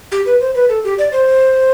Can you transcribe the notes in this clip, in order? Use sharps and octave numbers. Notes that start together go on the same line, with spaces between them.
G4
B4
C5
B4
A4
G4
D5
C5